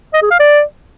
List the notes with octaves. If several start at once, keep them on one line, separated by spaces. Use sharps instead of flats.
D#5
G#4
F5
D5